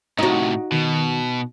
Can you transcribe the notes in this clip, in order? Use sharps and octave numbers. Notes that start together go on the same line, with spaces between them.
A2 C3 D#4 F#4
B2 D#3